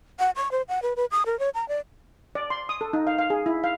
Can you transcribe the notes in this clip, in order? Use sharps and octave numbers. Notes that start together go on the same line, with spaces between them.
F#5
C#6
C5
F#5
B4
B4
D#6
A#4
C#5
A#5
D5
D5
C6
D#6
A4
D#4
F5
F5
G#4
E4
F5